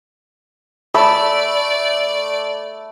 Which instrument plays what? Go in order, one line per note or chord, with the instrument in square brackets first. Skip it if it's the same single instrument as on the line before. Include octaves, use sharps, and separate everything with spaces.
[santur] A3 B5 E6 [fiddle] D5